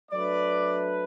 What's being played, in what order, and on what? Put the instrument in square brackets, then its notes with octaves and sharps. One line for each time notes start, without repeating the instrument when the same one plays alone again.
[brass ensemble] F#3 A3 D4 B4 [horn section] D5